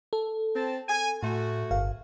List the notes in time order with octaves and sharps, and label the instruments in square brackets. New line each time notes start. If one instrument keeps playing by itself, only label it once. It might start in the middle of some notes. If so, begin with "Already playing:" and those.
[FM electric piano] A4
[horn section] C4 A5
G#5
[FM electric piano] A2 [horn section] A3 F#4
[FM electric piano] G1 F5